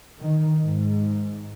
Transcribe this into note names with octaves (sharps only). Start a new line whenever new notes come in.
D#3
G#2